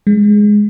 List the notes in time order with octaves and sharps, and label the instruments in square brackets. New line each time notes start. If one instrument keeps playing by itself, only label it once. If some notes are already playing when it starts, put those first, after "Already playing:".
[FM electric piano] G#3